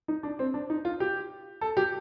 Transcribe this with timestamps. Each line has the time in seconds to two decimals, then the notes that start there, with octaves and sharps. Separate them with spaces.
0.08 D#4
0.23 D4
0.39 C4
0.54 D4
0.70 D#4
0.85 F4
1.00 G4
1.61 A4
1.77 G4